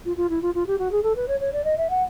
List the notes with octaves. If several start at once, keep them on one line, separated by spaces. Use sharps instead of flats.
F4
F4
E4
F4
F4
G4
F#4
G#4
A4
B4
C#5
C#5
D5
D#5
E5
F#5